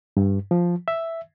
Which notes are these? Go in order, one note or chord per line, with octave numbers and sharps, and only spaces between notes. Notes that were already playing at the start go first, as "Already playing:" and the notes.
G2
F3
E5